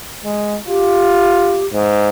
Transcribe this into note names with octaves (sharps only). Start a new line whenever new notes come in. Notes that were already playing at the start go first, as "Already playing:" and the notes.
G#3
F4 G4
G#2